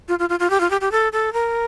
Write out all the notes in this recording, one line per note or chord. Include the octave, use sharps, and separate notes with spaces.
F4
F4
F4
F4
G4
F4
G4
G4
A4
A4
A#4